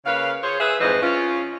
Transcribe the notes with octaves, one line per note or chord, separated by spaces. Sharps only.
C#3 A#3 B4 F5
F4 G#4 C5 C#5
G#4 B4 E5
F2 G#2 E3 B4 C5 D#5
C#4 F4